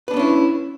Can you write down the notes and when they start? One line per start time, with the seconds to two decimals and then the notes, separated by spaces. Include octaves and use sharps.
0.08 B4
0.11 D4
0.14 B3
0.16 C#4
0.19 E4